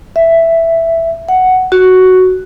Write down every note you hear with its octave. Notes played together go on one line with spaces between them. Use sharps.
E5
F#5
F#4